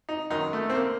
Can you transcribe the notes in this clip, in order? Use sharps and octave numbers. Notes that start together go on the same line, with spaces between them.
D#4
F#2 D#3 F#3 D#4
A3
C4
A#3